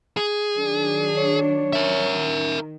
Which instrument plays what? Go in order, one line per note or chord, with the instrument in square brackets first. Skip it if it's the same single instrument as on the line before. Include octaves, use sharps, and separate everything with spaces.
[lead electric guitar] G#4
[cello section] D#3 F#3 D4
[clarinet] C#5
[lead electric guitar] A#4 E5
[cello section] D#3